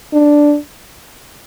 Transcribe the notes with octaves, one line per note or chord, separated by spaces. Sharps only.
D4